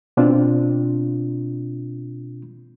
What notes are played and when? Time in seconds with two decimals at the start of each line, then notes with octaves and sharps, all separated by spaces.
0.17 B2 C4 D4 F4